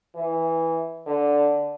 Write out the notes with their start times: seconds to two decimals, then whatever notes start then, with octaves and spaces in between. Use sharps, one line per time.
0.15 E3
1.06 D3